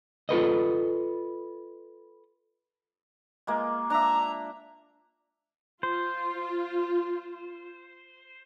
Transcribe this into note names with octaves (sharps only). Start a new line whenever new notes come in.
F4 A4 B4 D#5
G#3 A#3 F4
D4 E5 A#5
F4 C5